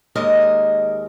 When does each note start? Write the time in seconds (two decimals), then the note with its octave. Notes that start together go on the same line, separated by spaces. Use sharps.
0.15 D#2 G#3 A#4 D#5